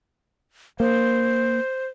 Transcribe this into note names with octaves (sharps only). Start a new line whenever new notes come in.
A#3 C5